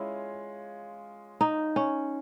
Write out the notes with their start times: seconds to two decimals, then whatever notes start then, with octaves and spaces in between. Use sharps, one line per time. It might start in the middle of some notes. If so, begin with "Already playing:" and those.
Already playing: G#3 C#4 E4 F4
1.41 D#4
1.76 C#4